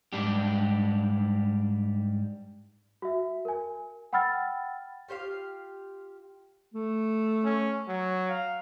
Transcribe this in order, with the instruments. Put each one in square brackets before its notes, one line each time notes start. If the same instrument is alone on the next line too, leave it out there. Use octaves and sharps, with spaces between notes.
[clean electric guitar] G#2 G3 D4 G4
[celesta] F#4 E5
A#4 G#5
F#5 G5 B5 E6 F6 A6
[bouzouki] F4 G4 C5 F5
[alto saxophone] A3
[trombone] C#4
F#3
[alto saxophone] F5